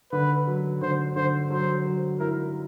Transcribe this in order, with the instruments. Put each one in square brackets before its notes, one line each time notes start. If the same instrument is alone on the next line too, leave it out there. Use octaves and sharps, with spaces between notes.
[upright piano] D3 [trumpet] B4
[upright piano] F#3
[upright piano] D3 [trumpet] C5
[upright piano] D3 [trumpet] C5
[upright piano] F#3 [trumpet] C5
[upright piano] F#3
[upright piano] E4 [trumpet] A#4